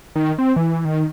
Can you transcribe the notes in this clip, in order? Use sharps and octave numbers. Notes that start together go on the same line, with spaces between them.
D#3
C4
E3
D#3